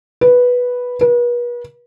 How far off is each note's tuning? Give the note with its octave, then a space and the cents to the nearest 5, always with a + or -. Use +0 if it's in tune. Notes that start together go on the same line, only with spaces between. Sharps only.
B4 -5
B4 -40